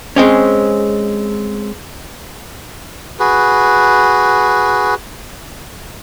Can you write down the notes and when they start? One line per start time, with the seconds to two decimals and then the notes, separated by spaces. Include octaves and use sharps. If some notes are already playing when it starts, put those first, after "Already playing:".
0.16 G#3 C4 C#4
3.20 F#4 G#4 B4